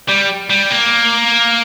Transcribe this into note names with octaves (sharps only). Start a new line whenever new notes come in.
G3
G3
A#3